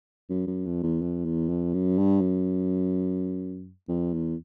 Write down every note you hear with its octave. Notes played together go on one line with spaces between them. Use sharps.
F#2
F#2
F2
E2
F2
E2
F2
F#2
G2
F#2
F2
E2